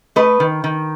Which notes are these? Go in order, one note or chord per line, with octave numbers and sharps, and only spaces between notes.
A3 B4 D#5
D#3
D#3